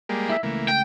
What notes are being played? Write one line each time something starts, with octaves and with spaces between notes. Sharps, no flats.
G3 G#3 A#3
E4 E5
C#2 E3 A3 A#3
G5